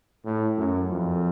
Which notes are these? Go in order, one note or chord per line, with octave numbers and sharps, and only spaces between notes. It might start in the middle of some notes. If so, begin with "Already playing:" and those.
A2
F#2
F2